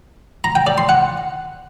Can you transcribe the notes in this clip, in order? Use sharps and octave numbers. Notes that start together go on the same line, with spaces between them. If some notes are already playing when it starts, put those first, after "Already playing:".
A#5
G5
D5
C6
F#5